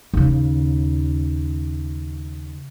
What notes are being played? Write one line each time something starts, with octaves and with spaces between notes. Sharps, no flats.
D#2 C#3